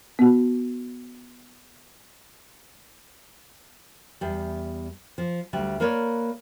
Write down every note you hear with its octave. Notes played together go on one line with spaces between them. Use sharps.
B3 F#4
E2 G3
F3
D2 G3
A#3 A#4 B4 C#5 D5